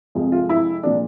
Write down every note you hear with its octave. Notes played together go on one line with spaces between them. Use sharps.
F2 C3 F3 G#3
F4
E4
A#2 F3 G#3 D4